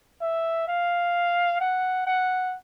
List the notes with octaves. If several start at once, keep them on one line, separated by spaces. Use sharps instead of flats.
E5
F5
F#5
F#5